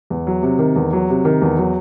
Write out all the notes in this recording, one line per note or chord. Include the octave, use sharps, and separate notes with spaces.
E2
F#3
C3
D#3
E2
F#3
C3
D#3
E2
F#3